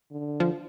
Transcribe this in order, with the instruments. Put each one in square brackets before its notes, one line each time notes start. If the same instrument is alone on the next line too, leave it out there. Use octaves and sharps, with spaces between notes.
[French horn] D3
[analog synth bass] F3